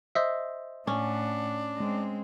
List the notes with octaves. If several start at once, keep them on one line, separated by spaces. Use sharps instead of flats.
C5 D#5 E5
A2 C#4 D4 F#5
G#3 C4